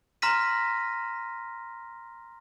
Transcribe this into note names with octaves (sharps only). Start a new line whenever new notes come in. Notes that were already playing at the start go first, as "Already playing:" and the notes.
A#5 C6 F6 A#6 B6 D#7